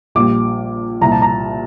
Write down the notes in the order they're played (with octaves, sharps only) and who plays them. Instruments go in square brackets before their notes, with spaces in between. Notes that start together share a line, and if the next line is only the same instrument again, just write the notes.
[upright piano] A#1 A#2 G3 D6
C2 A#2 F3 A#5
A5
A#5